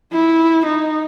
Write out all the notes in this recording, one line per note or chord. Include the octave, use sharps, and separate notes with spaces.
E4
D#4